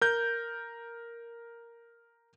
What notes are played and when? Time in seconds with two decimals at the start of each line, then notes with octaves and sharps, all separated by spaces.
0.01 A#4 G6